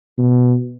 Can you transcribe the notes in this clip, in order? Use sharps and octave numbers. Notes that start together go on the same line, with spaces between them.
B2